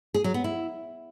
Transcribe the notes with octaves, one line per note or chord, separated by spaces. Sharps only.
G#4
F#3
B3
E4